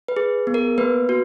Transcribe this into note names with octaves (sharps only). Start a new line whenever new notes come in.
B4
G#4
B3
A#4
A#3 B4
F#4